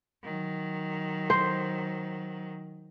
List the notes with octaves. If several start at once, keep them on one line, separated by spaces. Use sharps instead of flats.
D#3 F#3
C5